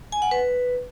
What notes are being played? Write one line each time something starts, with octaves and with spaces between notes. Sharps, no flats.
G#5
F#5
B4